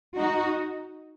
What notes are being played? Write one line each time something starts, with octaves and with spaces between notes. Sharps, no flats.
D#4 F#4